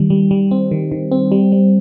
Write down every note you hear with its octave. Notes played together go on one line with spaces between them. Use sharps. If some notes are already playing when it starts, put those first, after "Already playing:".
Already playing: D#3 G3
G3
G3
C4
D#3
D#3
C4
G3
G3